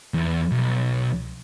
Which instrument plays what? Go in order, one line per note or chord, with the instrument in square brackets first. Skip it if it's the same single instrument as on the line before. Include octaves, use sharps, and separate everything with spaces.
[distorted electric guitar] E2
B1